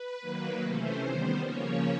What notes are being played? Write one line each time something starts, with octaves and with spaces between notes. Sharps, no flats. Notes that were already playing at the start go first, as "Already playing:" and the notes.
Already playing: B4
D#3 F#3 A#3
C3 E3 A3 C#4 C5
D#3 G3 B3 C5
C#3 F3 A#3 C#4 C#5